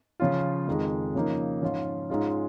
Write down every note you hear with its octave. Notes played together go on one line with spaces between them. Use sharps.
C#3 F3 C#4 F4
F2 D#3 G#3
C#3 F3 A#3 D#4
G#2 F3 C#4 F4
G#2 G#3 C#4 F4